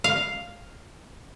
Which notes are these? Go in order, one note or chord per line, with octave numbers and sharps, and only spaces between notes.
F5